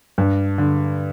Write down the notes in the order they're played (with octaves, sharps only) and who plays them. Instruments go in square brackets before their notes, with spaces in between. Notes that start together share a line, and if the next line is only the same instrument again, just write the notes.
[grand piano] G2
D3